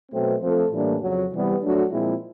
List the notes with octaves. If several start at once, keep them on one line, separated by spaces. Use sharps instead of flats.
B2 F#3 A3 C4
F3 A3 C4 F4 A4
A2 E3 G3 A#3 D4
F2 C#3 F#3
C3 E3 G3 B3
F#3 A3 D4 F#4 A4
A#2 F3 G#3 C4 E4